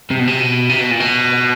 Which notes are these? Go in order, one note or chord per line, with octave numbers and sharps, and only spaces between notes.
C3
B2
C3
B2
C3
B2
A#2
B2